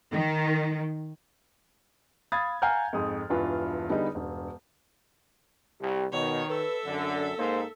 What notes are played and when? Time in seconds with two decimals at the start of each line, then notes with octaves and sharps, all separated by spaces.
0.12 D#3
2.32 F5 B5 D#6 G#6 A6
2.62 F5 F#5 G#5 A#5 F6 G6
2.93 F2 G#2 D#6
3.30 E1 G2 E3 F4 B4
3.89 D3 G3 B3 D#4 G#4
4.15 E1 G2
5.81 C2 G4
6.12 B2 D#3 C#5
6.49 A4 B4 E5
6.86 F#2 D3
7.38 G#2 A#3 D#4 C5